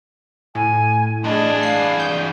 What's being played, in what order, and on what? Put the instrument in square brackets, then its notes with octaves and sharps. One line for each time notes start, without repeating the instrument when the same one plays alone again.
[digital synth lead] A2 [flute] G#5
[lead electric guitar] G2 E3 [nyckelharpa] D4 G#4 [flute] D#5
[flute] F5 [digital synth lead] C7
[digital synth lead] G6